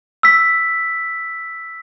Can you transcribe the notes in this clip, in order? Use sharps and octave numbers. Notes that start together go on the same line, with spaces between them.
E6 B6